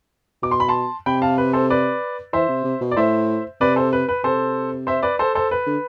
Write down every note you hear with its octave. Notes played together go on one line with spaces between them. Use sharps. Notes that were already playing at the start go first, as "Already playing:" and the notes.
B2 D6
C6
B5
A5 C6
C3 G5 B5
F5 A5
B4
A4 C5
B4 D5
E3 C5 E5
C3
C3
B2
D5
A2 C5 E5
C3 B4 D5
A4 C5
B4
B4
C3 A4 C5
C5 E5
B4 D5
A4 C5
A4 C5
B4
D3